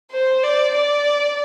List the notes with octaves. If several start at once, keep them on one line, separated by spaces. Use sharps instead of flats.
C5
D5
D5